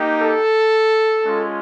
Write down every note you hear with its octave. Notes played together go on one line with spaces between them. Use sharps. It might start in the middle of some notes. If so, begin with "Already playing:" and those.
Already playing: A#3 D#4 G4
A4
G#3 C#4 F4